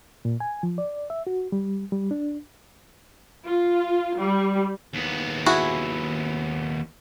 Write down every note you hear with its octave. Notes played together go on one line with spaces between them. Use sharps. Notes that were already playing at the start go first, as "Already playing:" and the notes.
A#2
G#5
F3
D5
E5
F#4
G3
G3
D4
F4
G3
D#2 B3
E4 F#4 G#4